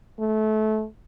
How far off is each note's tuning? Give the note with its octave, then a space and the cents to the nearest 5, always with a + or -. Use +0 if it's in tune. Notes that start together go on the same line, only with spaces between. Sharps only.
A3 -25